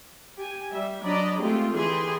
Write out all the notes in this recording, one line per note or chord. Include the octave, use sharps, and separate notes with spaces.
G4 G#5
G3 E5
F#3 D4 D5 D#5 A#5 B5
G#3 A3 C4 F4 G4 G#4
D3 E3 G4 G#4 B4 C6